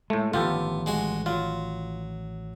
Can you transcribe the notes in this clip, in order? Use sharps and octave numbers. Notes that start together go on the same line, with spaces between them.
A2 G#3 A3
A1 D#3 F3 B3 F4 G4 A4
G#3 F#4 G#5
F#3 F4